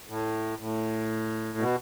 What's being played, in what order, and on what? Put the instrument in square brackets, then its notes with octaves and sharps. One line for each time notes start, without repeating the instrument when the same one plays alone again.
[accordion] A2
A2
B2